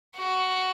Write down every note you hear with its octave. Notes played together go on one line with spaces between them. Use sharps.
F#4